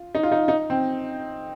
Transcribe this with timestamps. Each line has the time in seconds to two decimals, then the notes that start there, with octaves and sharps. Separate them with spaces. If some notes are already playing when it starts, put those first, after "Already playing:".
Already playing: F4
0.15 D#4
0.23 F4
0.32 D#4
0.48 D#4
0.70 C4